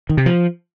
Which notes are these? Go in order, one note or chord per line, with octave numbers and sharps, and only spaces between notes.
D#3
C3
F3